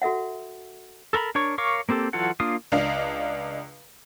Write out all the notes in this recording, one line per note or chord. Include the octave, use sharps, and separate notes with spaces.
F#4 A4 E5 F#5
A4 A#4 A#5 B5
D4 A#4 C#5 C#6
A#4 C#5 F5 C#6 D6
A#3 C4 G4 A4
E3 F#3 F4 A4 F#5
A#3 D4 F4 F5 D#6
C#2 D4 D#5 F5